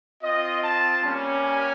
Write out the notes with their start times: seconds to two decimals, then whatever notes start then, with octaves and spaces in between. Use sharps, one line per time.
0.23 C4 F4 D#5
0.63 A5
1.03 G3 A#3 C#4
1.44 G#5